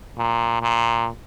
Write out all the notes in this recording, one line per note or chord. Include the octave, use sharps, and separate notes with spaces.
A#2
A#2